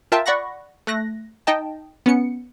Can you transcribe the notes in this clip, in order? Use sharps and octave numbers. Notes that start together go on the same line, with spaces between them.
F4 A#4 E5 G5 A5
D5 F#5 B5 C#6 F#6 A#6
A3 F#6 A#6
D#4 D#5 G5 A5
B3 C#4 C#7